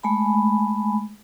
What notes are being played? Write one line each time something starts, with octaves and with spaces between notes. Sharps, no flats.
G#3 A3 G#5 B5